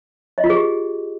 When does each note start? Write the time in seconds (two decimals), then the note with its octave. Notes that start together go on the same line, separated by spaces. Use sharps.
0.38 D#5
0.44 F4
0.50 G#4
0.56 G4